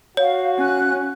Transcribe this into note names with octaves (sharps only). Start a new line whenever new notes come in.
F#4 C#5 F5
C#4 F#6